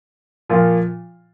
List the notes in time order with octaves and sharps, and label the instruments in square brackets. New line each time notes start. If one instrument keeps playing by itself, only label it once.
[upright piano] A#2 F3 A#3 F4